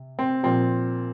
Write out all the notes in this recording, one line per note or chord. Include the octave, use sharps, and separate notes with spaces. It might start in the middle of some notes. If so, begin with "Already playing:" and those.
Already playing: C3
C4
A#2 F3 C4